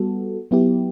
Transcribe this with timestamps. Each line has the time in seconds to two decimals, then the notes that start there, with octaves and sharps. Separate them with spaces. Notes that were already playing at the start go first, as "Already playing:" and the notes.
Already playing: G3 B3 F#4 A4
0.51 F#3 B3 E4 G4